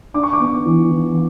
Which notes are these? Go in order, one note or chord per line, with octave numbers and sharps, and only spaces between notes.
D4 D6
C#6
D6
B3
E3
E3